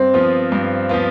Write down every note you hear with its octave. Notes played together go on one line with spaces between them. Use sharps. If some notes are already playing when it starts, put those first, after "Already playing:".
Already playing: G2 C4
F3 B3 F4
G2
F3 B3 F4